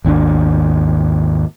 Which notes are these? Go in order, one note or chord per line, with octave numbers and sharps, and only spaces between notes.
G#1 D#2 C#4 D4